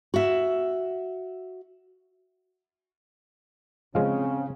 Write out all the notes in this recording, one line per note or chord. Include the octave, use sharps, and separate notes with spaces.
F#4 E5
C#3 F3 G#3 C4 C#4 F5